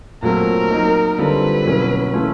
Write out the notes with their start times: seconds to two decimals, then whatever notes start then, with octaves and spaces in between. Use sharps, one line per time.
0.22 A#2 F#3 A3 C4 A#4
0.71 F#3 A#3 D#4
1.18 D3 G3 C4 F4 A4 B4
1.65 B2 F#3 A#3 C#4 E4
2.14 E3 A3 C#4 F4